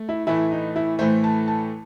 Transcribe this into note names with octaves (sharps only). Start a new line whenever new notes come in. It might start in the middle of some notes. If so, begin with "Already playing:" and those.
Already playing: A3
E4
A2 E3 A3 E4
D#4
E4
A2 E3 A3 C5
A5
A5